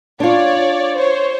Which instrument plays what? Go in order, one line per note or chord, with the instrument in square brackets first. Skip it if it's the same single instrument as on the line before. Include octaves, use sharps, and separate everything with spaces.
[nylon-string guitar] D4 F4 [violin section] C#5 D5
[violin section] C5 C#5